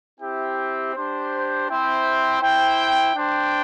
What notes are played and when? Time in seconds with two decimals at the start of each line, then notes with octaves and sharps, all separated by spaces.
0.20 C4 E4 G4 E5 G5
0.95 D4 G4 C5
1.69 C4 E4 C5 E5 G5
2.42 E4 C5 G5
3.16 D4 C5 G5